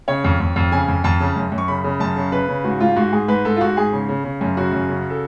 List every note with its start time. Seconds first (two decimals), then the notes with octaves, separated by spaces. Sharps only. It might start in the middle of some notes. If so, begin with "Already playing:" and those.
0.08 C#3 C#5
0.24 F2
0.40 F2
0.56 F2
0.72 C#3 G#5
0.88 F2
1.04 F2 A5
1.20 C#3
1.36 F#2
1.52 F#2
1.58 C#6
1.68 C#3 B5
1.84 C#3
2.00 F#2 A5
2.16 C#3
2.32 C#3 B4
2.48 C#3
2.64 G#2 F#4
2.80 G#2 F4
2.96 G#2 F#4
3.12 G#2 G#4
3.28 G#2 B4
3.45 G#2 A4
3.56 F4
3.61 G#2 F#4
3.77 G#2 G#4
3.93 C#3
4.09 C#3
4.24 C#3
4.41 F#2
4.57 C#3 F#4
4.73 F#2
4.89 C#3
5.10 A4